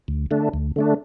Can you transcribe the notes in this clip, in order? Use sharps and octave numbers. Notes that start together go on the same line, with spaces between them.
D2
D3 A3 D4
D2
D3 A3 D4